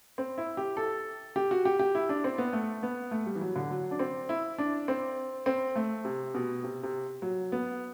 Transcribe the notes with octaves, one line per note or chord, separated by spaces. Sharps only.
C4
E4
G4
A4
G4
F#4
G4
G4
E4
D4
C4
B3
A3
B3
A3
G3
E3
F#3
D3
F#3
D4
C4
E4
D4
C4
C4
A3
C3
B2
C3
C3
F#3
B3